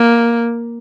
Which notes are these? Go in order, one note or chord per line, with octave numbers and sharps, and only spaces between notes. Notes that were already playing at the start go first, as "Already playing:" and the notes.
Already playing: A#3